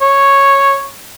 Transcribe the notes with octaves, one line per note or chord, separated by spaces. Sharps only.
C#5